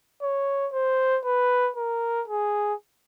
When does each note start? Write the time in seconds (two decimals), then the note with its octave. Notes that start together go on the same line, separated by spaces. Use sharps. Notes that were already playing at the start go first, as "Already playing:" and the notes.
0.22 C#5
0.73 C5
1.25 B4
1.76 A#4
2.28 G#4